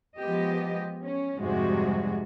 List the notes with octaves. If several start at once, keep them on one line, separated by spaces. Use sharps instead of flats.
F3 G#3 B3 G4 D#5
C#4
F2 G#2 C3 G3 G#3 F#4